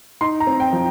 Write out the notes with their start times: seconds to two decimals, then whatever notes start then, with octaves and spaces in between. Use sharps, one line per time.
0.21 D#4 C6
0.40 A#5
0.47 C4
0.60 G5
0.73 F3